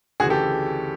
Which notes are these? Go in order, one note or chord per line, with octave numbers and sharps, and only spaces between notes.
D2 C#3 E3 F#4 G#4
G4 A4